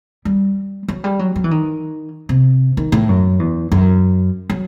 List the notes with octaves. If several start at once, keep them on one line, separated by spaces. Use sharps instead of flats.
G3
F#3
G3
F#3
F#3
E3
D#3
C3
D#3
A2
F#2
E2
F#2
F#3